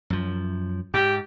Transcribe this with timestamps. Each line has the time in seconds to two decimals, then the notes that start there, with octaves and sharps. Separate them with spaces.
0.10 F#2 F3
0.94 G#2 G4